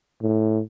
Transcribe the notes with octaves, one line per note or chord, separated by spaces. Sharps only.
A2